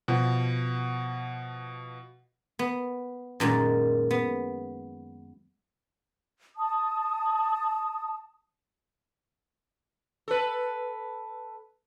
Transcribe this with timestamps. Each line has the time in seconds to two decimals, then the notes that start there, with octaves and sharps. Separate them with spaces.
0.08 B2 F3
2.59 B3
3.40 F#2 A#2 D#3 G#3
4.11 B3
6.57 A5 D#6
10.28 A4 B4